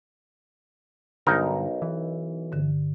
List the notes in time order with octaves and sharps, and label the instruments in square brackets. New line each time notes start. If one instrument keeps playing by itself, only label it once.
[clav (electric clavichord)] B1 D#4 A#4 [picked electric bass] G2 D3
[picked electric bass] E3
[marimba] G2 D3